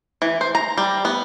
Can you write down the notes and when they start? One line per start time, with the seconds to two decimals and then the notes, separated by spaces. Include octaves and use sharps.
0.22 E3
0.41 C5
0.55 A#5
0.78 G3
1.05 B3